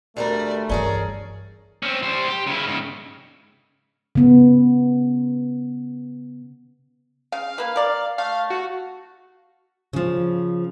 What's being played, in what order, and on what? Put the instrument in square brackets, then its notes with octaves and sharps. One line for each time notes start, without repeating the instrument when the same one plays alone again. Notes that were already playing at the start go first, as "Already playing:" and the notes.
[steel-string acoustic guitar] D2 G3 A#4 [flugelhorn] A3 [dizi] D5
[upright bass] G2 E3 [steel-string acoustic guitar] C#4 G#4 A#4 [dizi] D5
[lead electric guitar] C4 C#4
G3 C5
G4
C#3 E4
G#2 C#3
[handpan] C#3 B3
[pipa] C#3 [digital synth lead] F5
[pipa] A#3 B4
A#4 D5
[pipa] A3 [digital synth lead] F5
[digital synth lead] F#4
[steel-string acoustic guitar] C#3 F3